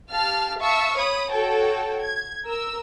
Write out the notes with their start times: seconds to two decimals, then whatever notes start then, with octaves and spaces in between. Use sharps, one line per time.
0.11 G4 F5 A5 F6
0.59 E5 F5 A5 C#6 E6
0.97 C#5 B5 D#6
1.31 F#4 A4 C#5 G5 A5
2.00 G#6
2.46 A#4 E6